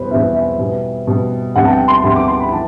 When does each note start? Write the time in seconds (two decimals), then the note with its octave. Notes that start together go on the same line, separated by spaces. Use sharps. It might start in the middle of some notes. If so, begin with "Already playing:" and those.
Already playing: E2 B2 G3 B3 B4 C5
0.11 E2 B2 G3 B3 E5
0.34 E5
0.59 B2 G3 B3
1.07 B2 G3 B3
1.56 D2 C3 G3 B3 F#5
1.65 A5
1.71 G5
1.88 C6
2.03 D2 C3 G3 B3 C6
2.16 D6
2.28 C6
2.40 B5
2.52 E3 A5